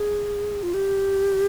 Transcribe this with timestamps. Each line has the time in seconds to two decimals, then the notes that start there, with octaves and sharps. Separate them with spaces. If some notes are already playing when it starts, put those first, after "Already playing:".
Already playing: G#4
0.63 F4
0.74 G4